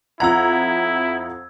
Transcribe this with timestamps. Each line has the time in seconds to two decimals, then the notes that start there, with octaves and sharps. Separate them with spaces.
0.20 F2 E4 F#5 A#5 E6 G#6